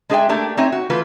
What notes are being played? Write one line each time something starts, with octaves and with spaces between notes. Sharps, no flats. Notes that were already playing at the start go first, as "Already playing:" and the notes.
G#3 D4 G#4 D#5 E5 G5
A3 A#3 D4 G4
C4 D#4 C#5 E5 G#5
F#4
E3 A3 F4 B4